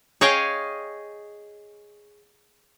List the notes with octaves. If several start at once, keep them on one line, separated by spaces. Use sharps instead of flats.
G#4 C#5 D#5 F5 G5 G#5